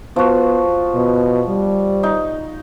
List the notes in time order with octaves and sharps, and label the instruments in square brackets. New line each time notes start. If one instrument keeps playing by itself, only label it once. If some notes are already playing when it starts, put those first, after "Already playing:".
[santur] F3 F#4 [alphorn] B3
[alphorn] B2
G3
[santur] D#4